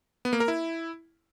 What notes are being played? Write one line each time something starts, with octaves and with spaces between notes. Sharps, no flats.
B3
A#3
A#4
E4